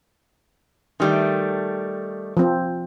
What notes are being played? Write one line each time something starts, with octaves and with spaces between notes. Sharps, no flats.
D#3 G3 A3
F3 C4